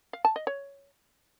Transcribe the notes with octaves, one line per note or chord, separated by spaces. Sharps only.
F5
A5
D#5
C#5